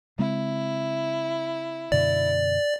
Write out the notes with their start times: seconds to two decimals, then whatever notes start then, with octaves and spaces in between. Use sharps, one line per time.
0.19 C#3 G#3 C4 E4
1.92 F#2 B2 D3 D5